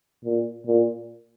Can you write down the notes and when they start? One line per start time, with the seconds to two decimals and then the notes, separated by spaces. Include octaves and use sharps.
0.24 A#2
0.66 A#2